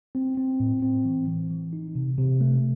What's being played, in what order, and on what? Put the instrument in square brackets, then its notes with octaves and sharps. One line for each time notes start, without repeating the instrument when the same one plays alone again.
[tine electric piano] C4
C4
A2
C4
E3
E3
E3
D#4
C3
C3
A3